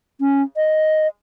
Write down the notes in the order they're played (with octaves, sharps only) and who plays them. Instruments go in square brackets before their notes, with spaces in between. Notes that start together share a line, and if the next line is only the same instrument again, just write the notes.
[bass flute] C#4
D#5